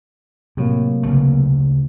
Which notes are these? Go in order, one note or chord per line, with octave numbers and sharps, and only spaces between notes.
A2 C3 F#3 A#3
D2 C#3 A3